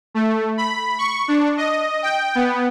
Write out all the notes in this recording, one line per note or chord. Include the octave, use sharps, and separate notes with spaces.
A3
B5
C#6
D4
D#5
G5
B3